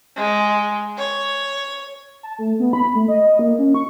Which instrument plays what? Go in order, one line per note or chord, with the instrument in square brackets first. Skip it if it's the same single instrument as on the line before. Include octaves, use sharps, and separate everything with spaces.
[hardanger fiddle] G#3
C#5
[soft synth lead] A5
A3
B3
B5
A3
D#5
A#3
C#4
C#6